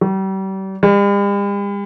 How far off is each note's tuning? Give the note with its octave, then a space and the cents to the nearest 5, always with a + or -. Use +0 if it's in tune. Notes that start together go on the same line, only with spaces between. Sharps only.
G3 -35
G3 +45